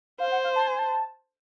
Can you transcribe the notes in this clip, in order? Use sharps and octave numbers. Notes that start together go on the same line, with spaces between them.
C5 F5
F#5
F5
A5
G#5
A5